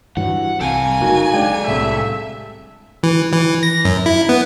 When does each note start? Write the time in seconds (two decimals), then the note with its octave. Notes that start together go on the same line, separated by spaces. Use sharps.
0.17 G2 E3 F#3 F#5
0.61 C2 A4 F5 G#5
1.01 F#1 A#3 D#4 F#4
1.33 G#3 D4 G5
1.67 C2 A2 E5
3.03 E3
3.33 E3
3.63 A#6
3.85 F#2
4.06 E4
4.29 B3